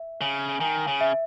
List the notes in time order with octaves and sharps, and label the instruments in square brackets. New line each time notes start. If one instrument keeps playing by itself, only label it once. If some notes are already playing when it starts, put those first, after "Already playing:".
Already playing: [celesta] E5
[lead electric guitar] C#3
[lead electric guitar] D#3 [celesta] G#5
[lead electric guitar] C#3
[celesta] E5